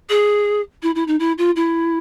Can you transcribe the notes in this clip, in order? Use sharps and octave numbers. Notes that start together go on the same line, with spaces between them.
G#4
E4
E4
D#4
E4
F4
E4